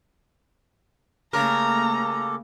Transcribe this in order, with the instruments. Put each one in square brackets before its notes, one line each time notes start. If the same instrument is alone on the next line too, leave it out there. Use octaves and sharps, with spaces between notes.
[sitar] C#3 A#4 [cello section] A3 A#3 [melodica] G4 A4 [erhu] A#5